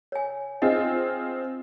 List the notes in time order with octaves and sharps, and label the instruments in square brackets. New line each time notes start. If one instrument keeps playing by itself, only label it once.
[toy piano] C#5 G#5
[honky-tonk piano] C4 F4 G#4 [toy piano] D#5